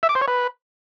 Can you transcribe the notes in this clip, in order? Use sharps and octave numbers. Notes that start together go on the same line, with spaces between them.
E5
D6
C5
C#5
B4